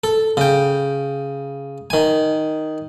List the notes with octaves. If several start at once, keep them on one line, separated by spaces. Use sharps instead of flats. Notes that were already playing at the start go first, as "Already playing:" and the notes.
A4
C#3 G5
D#3 G#5